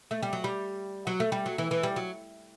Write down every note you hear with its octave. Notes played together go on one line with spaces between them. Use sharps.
A3
G3
F#3
G3
F#3
A3
G3
F#3
E3
E3
G3
F#3